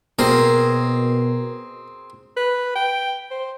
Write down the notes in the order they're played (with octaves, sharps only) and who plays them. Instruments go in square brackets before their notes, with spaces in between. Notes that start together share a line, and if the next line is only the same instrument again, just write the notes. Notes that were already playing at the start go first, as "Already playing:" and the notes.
[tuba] B2 [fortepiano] A#3 [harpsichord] C4 G#4 A#5 [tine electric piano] A#4
[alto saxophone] B4
G5
C5